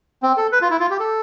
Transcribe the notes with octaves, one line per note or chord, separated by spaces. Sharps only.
C4
A4
B4
F4
E4
F4
G4
A4